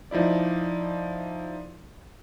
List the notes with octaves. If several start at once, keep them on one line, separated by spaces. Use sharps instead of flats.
F3 D#4 E4 D5